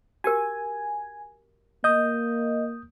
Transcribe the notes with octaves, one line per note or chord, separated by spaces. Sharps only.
F#4 G4 A#4 G#5
A#3 D#5 D#6 G6